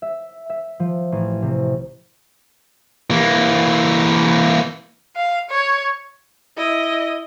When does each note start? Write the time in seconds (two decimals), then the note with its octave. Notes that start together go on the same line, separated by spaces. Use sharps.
0.02 E5
0.50 E5
0.80 F3
1.12 A1
1.42 C3
3.11 E3 A#3
5.16 F5
5.50 C#5
6.57 E4 D#5